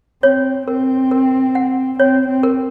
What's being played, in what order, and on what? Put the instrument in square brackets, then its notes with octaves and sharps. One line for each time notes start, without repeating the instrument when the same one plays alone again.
[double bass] C4 [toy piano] C#5
[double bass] C4 [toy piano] A#4
[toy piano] A#4
F#5
[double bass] C4 [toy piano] C#5
[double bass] C4
[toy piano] A#4